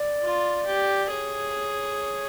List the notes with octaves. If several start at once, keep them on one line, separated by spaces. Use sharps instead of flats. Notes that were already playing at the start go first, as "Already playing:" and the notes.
Already playing: D5
F4
G4
G#4 C#5